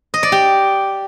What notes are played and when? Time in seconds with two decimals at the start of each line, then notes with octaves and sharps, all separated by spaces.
0.14 D#5
0.23 D5
0.32 G4